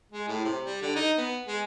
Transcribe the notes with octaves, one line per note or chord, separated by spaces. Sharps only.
G#3
A2
C3
G3
D3
D#4
B3
G#3